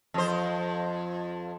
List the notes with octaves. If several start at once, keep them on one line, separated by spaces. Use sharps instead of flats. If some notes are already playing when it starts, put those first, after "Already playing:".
F2 C5